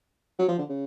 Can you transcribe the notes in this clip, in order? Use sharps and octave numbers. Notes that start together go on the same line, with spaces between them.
F#3
F3
D3
C#3